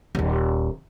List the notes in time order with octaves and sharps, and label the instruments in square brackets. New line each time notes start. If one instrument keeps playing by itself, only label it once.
[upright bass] D#1 D#2